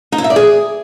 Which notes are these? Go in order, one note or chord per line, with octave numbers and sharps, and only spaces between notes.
D#4
E4
E5
D5
G#4